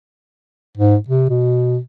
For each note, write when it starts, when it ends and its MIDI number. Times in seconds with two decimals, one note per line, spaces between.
0.78 0.97 44
1.09 1.25 48
1.30 1.78 47